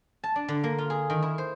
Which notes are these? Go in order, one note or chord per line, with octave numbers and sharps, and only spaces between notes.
A5
D4
D3
A#3
F4
G#4
D#3
E4
C5